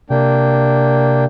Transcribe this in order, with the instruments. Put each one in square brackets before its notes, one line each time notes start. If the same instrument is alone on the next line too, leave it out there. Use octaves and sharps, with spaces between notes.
[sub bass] C3 [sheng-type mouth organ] A#3 D4 G5